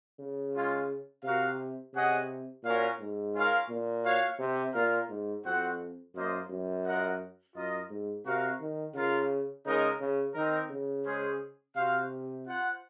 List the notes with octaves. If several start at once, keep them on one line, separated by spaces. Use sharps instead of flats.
C#3
G#3 C#4 F4
C3 F#4 A#4 F5
C3 C#4 G#4 D#5 F#5
A#2 C#4 F#4 A#4 C#5 F5
G#2
C#4 F4 A#4 F5
A#2
F#4 C#5 F5
C3
A#2 F4 A#4 F5
G#2
F2 C4 F#4 C5 F#5
F#2 A#3 F4 C5 D#5
F#2
F4 A#4 D#5 F#5
F#2 F4 A#4 D#5
G#2
C3 F#4 A#4 F5
D#3
C#3 F4 A#4 F5
C#3 G#3 D#4 A#4 D#5
C#3
D#3 C4 D#4 A#4
C#3
G#3 C#4 G#4 C5
C3 C4 F#4 C5 F5
F4 C5 F#5